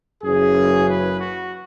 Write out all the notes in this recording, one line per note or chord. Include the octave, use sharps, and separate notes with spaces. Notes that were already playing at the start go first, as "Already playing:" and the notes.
F#1 F#2 E3 C#4 G#4
B4
F#4